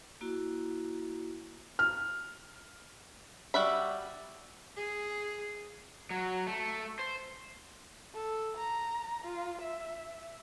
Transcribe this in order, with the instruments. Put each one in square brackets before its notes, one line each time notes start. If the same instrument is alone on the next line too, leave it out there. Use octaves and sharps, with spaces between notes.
[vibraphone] A#3 E4 F#4
[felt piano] F6
[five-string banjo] G3 F#4 E5 B5
[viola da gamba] G#4
[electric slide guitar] F#3
A3
C5
[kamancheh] A4
A#5
F4
E5